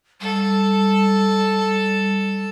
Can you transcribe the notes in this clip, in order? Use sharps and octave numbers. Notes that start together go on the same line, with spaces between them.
G3 A4